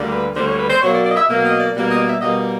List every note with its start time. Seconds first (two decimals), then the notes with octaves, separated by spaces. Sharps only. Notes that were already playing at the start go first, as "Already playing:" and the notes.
Already playing: D2 D3 G3 A#3
0.12 B4
0.35 D2 D3 G3 A#3 C5
0.48 C#5
0.58 B4
0.70 C5
0.82 B2 F#3 A#3 C#5
0.94 D5
1.05 D5
1.12 D#5
1.16 E5
1.29 B2 F#3 A#3
1.45 D#5
1.60 D5
1.75 B2 G3 A#3
1.90 D#5
2.06 E5
2.22 B2 G3 A#3 D#5